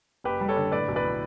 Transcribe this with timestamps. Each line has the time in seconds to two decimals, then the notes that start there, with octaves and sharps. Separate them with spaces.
0.24 F#1 G4 B4
0.41 G3
0.49 A4 C#5
0.57 D3
0.72 A2 B4 D5
0.88 B1
0.96 B4 D5
1.04 A2